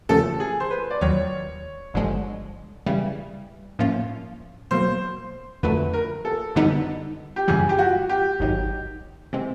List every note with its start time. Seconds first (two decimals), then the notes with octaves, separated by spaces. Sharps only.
0.09 E2 C#3 F3 A3 C#4 A4
0.40 G#4
0.60 C5
0.71 B4
0.90 D5
1.01 D#2 D#3 F#3 C#5
1.94 G1 G2 D3 F3 G#3
2.86 C#3 E3 G3
3.79 A2 F3 A#3 C#4 F4
4.71 B2 F#3 A#3 C5
5.63 F2 D3 F#3 A3 B4
5.93 A#4
6.25 A4
6.55 F#2 D3 G3 B3 D#4
7.36 G4
7.48 F#2 C#3 E3 G3 G#4
7.69 G4
7.78 F#4
8.09 G4
8.40 G#1 G#2 D#3 F#3
9.33 C3 E3 G#3 C4